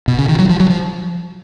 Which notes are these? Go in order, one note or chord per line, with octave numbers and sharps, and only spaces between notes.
B2
C#3
D#3
F#3
F3
F#3
F3